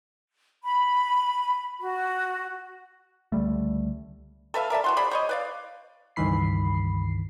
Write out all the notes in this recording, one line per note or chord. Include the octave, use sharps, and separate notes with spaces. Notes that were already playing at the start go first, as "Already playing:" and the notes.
B5
F#4
C#2 D3 G3 A3
A4 B4 E5 F5
A#4 D5 E5 A5
E3 F#4 C6
G#4 C5 D5 B5
C5 C#5 D#5
B4 D5 F5
C#2 G2 D#3 E3 B5 C7